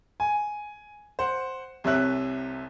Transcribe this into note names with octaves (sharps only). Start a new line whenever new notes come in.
G#5
C5 F#5
C2 C3 C#5 E5 F#6